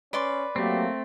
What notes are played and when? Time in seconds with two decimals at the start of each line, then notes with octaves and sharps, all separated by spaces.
0.13 C#4 B4 D5 C6
0.56 F#3 A3 A#3 C4 G4